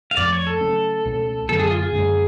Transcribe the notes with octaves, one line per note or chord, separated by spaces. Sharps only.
F5
F2 F3 A3 D5
C#5
A4
C#3 F#3 A3 C#4
C#2 B2 A3 C#4
F#2 D3 F#3 B3 A4
G#4
F4
G#4
F#2 D3 G#3 C#4